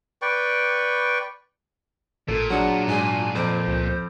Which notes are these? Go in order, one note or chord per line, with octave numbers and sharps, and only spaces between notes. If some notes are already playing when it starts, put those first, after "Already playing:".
B4 D5 G5 C#6
A1 A#2 A4
F#3 D4 G#4 F#5
G#2 G#5
F2 C5 D7
C#2